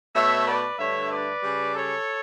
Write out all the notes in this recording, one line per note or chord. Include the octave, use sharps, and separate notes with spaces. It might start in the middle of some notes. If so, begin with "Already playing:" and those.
B2 A3 C#5 E5
B4 D5
G2 D3 A3 C#5 E5
B4 D5
C#3 G3
A4 C#5